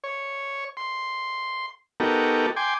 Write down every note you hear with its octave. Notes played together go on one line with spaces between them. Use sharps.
C#5
C6
B3 D#4 F#4 G4 A4 A#4
G5 G#5 C6 D6